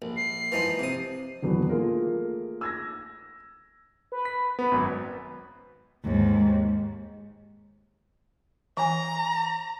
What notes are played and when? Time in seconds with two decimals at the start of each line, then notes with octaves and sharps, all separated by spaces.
0.02 A#1
0.17 C7
0.52 E3 F3 D#4
0.79 C3 D#6
1.42 D#1 E2 F#3 B3 D4
1.69 A3 A#3 F4 G#4 A#4
2.61 E6 G#6 A#6
4.12 B4
4.25 B6
4.59 B3 B4
4.71 G#1 F#2
6.03 D#2 G#2
8.77 E3 G#5 A#5